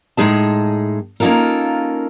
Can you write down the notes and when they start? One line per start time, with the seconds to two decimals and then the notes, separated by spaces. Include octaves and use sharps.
0.17 A2 G#3 D#4 G#4 A5
1.20 A#3 C#4 D#4 F4 A4 A#4